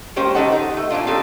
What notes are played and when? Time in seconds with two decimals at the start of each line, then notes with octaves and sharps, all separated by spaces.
0.16 G#3 A#3 C#4 G4 C5
0.35 D#3 D#4 G4 A4 D#5 F#5
0.52 D#4
0.77 A3
0.90 A#2 C#4 D4 F4
1.07 C4 D#4 G4 A4